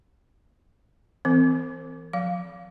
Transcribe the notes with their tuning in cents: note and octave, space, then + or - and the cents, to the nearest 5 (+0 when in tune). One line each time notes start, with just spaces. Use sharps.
E3 +0 C4 -15 A#4 -40
F3 +45 F5 +0